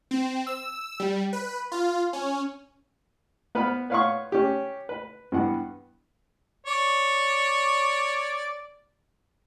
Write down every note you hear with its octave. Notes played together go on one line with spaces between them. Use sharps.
C4
E6
G3
B4
F4
C#4
B3 B4 C5 B5 F6
B4 C#5 F5 F#5 C6 C#6
C#4 G4
B4
G2 E3 B3 F#5
C#5 D5